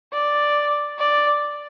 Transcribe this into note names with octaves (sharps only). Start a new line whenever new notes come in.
D5
D5